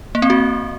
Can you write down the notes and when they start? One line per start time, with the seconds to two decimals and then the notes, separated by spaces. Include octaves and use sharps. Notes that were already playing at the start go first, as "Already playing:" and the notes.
0.15 A#3
0.22 C4
0.30 F#4